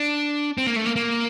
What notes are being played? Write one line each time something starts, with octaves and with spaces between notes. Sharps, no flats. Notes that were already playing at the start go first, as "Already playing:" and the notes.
Already playing: D4
C4
A#3
A3
A#3
A#3